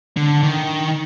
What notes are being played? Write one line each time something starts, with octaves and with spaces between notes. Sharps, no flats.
D3
D#3